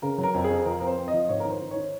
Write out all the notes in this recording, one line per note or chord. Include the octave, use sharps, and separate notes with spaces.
C#3 A#4
F#3
A#4
F2
G#4
F2
F3 A#4
C4 A#4
C5
C4
D#5
F3
G#2 C#5
D#3 A#4
C5
D#3
C#5
D#3